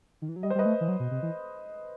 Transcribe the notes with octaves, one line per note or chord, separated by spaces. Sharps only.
D#3
E3
F#3
G3 D#5
C5
G3
B4 D#5
A3
E3
F#3
B2
C3
E3